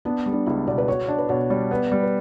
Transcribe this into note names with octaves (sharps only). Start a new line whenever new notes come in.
B3 D4
G3
D4
C#2 E4
B2 D5
B4
F#4 C#5
D4
B4
B2 C#5
G3 C#5
B3 D5
G3
B4